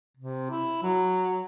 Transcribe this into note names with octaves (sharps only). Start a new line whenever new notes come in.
C3
E4
F#3